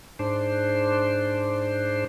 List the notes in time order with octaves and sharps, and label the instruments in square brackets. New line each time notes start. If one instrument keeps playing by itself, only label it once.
[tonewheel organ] G#2 D4 C5